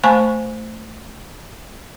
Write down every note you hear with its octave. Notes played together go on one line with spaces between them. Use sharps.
A3 C5 G#5 A5 B5 C#6